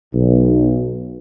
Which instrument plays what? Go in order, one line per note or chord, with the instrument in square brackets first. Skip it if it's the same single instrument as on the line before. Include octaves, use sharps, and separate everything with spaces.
[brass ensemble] B1